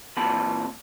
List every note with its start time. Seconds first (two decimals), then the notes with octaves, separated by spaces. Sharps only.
0.17 A#2 E3 C4 F#5 A5 B5